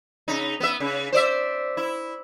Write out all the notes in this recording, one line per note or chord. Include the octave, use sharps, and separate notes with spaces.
C#3 D#4
B3 E5
C#3
C5 D5 E5
E4